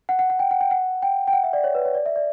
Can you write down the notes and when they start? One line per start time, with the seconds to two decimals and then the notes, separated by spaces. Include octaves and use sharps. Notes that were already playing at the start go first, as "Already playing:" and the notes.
0.09 F#5
0.19 F#5
0.30 F#5
0.39 G5
0.51 F#5
0.61 G5
0.71 F#5
1.02 G5
1.27 G5
1.33 F#5
1.44 E5
1.53 D5
1.64 C#5
1.75 B4
1.85 C#5
1.95 D5
2.06 E5
2.16 D5